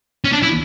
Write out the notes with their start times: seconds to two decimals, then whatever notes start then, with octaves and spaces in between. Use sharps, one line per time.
0.24 C#4
0.33 D4
0.43 E4